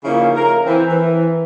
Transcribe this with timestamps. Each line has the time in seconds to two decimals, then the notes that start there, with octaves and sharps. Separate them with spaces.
0.04 C#3 F3 A#3 C#4 D#4 E4
0.36 A#4
0.65 E3 C4
0.89 E3